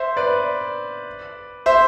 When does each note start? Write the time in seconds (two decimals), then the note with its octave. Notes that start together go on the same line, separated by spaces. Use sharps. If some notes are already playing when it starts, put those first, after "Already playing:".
Already playing: C5 E5
0.17 B4 D5
1.66 C5 E5